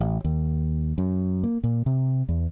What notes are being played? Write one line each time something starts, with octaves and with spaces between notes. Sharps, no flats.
A1
D#2
F#2
A#3
A#2
C3
E2